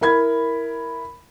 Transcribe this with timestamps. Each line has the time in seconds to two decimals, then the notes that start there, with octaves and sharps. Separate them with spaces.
0.01 E4 A#4 B5 G#6